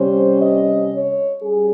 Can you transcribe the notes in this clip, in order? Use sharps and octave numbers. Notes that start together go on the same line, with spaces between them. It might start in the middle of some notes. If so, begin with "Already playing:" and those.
Already playing: C3 G3 C#4 C5
D#5
C#5
G3 C#4 G#4